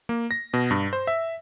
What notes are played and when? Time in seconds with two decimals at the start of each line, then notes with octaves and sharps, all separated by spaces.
0.09 A#3
0.31 A#6
0.54 B2
0.71 G2
0.93 C5
1.07 E5